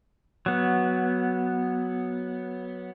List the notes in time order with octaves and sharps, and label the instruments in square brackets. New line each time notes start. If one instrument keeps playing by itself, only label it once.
[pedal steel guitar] F#3 B3